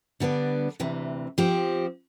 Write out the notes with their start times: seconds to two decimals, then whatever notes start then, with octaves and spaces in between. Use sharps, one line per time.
0.20 D3 G3 B3 D4
0.80 D2 C3 E3
1.38 F3 C4 G4